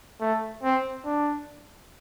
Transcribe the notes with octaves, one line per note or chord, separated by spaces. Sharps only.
A3
C4
D4